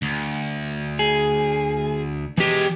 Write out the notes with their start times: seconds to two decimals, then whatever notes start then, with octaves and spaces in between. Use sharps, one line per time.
0.02 D2
0.99 G#4
2.38 E2 E3 G#3 G4